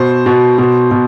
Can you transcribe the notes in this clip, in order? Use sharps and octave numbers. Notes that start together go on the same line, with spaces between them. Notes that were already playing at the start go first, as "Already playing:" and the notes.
Already playing: B2 C5
B2
B2
B2